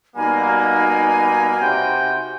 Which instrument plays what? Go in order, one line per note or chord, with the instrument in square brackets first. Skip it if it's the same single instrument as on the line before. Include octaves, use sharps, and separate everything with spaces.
[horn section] B2 G3 A#3 [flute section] D#4 G#5 B5
[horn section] C3 F#4 G5